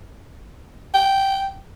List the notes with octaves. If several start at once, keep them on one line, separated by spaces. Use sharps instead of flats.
G5